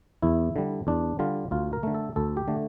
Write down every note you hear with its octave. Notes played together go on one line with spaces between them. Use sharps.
E2 E4
D3 G3
E2 D4
D3 G3 F4
D2 F4
A#4
D3 A3
A4
D2 A4
G4
D3 A3